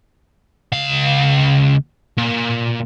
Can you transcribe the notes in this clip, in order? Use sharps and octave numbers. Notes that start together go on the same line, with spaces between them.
C#2 F5
A#2